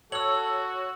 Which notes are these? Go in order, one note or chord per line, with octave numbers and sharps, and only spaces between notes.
F#4 A4 C#5 E6 F#7